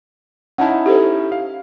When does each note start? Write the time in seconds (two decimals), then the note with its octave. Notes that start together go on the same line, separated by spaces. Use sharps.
0.58 C#4 D#4 E4 F#5 A5
0.86 G4 A4 C5
1.32 F5